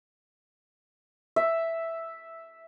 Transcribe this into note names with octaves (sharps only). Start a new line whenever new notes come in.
E5